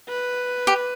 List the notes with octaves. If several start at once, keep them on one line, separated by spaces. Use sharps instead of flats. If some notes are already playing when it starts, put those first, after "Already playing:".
B4
G4